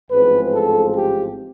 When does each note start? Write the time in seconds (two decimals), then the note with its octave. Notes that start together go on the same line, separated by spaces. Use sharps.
0.10 A1 G#2 F3 G#3 C4 B4
0.53 A4
0.95 G4